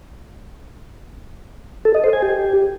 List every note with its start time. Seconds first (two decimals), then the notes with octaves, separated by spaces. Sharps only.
1.85 A4
1.94 D#5
2.04 C5
2.13 G#5
2.22 G4